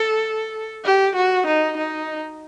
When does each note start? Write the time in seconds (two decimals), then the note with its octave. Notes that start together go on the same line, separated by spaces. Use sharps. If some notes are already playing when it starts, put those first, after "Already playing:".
Already playing: A4
0.85 G4
1.16 F#4
1.47 D#4
1.78 D#4